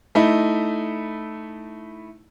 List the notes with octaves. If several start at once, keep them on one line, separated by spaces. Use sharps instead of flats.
A3 D#4 E4